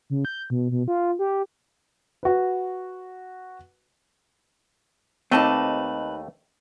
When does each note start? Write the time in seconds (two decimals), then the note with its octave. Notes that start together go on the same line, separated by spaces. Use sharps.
0.10 C#3
0.25 G6
0.50 B2
0.71 B2
0.88 F4
1.19 G4
2.23 F#4 B4
5.31 D#2 A3 C4 D#4 B4 D#5 A5 D6